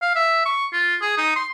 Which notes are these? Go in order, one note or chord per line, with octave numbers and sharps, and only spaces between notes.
F5
E5
C#6
F4
G#4
D#4
C6